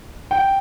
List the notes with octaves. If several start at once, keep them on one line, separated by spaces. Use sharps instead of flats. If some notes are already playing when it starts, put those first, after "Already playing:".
G5